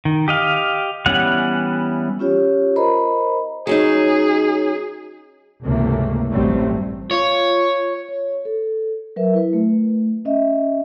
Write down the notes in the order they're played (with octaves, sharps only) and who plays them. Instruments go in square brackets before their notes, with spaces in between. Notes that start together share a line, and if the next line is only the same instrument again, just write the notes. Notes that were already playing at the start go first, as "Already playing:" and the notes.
[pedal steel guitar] D#3
G4 D#5 F5
E3 G3 B3 C#4 F#5
[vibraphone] C#4 F4 G4 C#5
A#4 C5 D#5 A#5 B5
[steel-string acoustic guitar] F#3 C#4 D#4 [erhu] G#4
[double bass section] C#2 G2 C3 E3 A3 A#3
A1 G2 F#3 G3 A3 C4
[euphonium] F4 [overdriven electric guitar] C#5
[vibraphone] C#5
A4
F#3 A#4 B4 E5
E4 B4
A3
C#4 D#5 E5